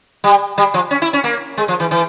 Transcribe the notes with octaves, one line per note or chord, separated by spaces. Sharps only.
G3
G3
F3
C#4
E4
C#4
A#3
G#3
F3
E3
E3